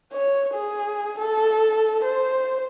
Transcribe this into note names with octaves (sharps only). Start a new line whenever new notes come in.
C#5
G#4
A4
C5